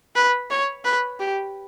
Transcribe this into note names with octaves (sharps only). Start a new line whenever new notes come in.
B4
C#5
B4
G4